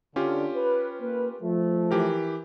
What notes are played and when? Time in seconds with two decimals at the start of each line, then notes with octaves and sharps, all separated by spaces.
0.16 D3 C#4 F4 G4
0.56 B4
1.00 A#3 B4
1.43 F3 A3
1.91 E3 G4 A#4